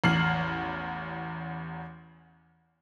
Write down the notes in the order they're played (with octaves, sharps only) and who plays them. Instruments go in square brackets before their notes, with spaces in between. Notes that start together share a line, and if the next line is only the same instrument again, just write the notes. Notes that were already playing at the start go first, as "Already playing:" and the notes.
[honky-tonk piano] A1 E2 F6 C7 F#7